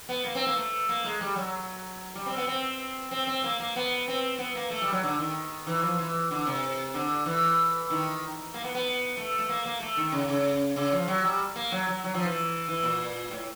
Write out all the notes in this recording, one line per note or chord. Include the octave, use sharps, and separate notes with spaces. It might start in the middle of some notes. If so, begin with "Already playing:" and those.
B3
A#3
C4
A#3
A3
A#3
G#3
G3
F#3
G3
C4
B3
C4
C4
C4
A#3
A#3
B3
C4
B3
A#3
A3
G3
F#3
D3
D#3
E3
F3
E3
D3
C3
D3
E3
D#3
A#3
B3
B3
A3
A3
A#3
A#3
A3
D#3
C#3
C#3
C#3
F3
F#3
G3
A#3
F#3
F#3
F#3
F3
E3
E3
A#2
A2